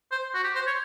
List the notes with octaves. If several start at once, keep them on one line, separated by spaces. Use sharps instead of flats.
C5
F#4
G4
C5
C#5